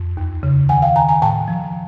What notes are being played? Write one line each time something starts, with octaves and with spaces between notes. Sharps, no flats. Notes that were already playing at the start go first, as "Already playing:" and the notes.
Already playing: F2
D#2
C#3
D#3 F#5 G#5
F5 G5
D#3 G#5 A#5
G#5 A#5
A2 G5 A5
F3